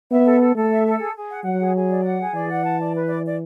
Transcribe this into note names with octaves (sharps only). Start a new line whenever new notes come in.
B3 E5
A4
A4
A3 A4
E5
A4
G#4
G#4
F#5
F#3 F#5
G#4
G#4
D5
F#5
G#4
E3 D5
F#5
A5
D5
B4
D5
D5